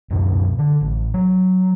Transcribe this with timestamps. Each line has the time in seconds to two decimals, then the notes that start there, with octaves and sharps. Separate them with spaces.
0.10 D1 F#2 B2
0.59 D3
0.81 A1
1.14 F#3